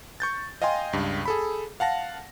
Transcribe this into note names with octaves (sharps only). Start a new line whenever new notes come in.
C#6 G6 A6
D#5 F5 G5 G#5 C6
C#2 G2
G#4 A4 B5
F5 F#5 A5 A#6